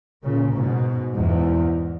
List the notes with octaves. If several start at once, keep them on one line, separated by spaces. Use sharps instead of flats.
A#2 C#3
G#2 B2
E2 G#2